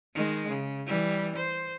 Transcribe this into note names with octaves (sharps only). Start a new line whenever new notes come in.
D#3 G#3
C#3
E3 G3
C5